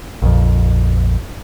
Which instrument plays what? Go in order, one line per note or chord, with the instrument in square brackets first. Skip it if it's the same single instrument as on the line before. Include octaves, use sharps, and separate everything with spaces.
[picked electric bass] A#1 F2